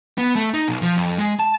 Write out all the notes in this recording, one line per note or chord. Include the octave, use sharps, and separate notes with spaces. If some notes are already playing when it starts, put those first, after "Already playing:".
B3
A3
D#4
B1
F3
F2
G#3
A5